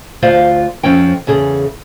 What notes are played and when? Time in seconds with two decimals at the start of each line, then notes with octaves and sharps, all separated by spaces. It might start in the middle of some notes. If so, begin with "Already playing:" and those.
0.22 D2 F4 C5 D5 F5
0.83 F2 F3 C#4 C#5 G5
1.27 E2 C#3 G#4 A4